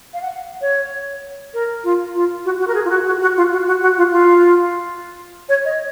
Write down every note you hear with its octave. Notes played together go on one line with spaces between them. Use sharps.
F5
F#5
C#5
A#4
F4
F4
F#4
F#4
A#4
G#4
F4
F#4
F#4
F#4
F4
F#4
F#4
F#4
F4
F4
C#5
D#5